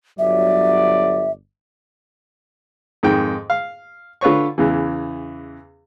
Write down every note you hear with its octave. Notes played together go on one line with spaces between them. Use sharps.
G1 F#3 D5 E5
F2 G#2 D#3 G5
F5
D3 F4 B4 C#5 C#6
E2 C#3 E3